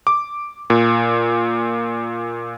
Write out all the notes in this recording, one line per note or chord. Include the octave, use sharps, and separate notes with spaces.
D6
A#2